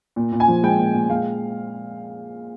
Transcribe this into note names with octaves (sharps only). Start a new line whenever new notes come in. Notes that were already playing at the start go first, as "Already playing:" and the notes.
A#2
A#2
G#5
F3
G#3 G5
A#2
A#2
G#3 F5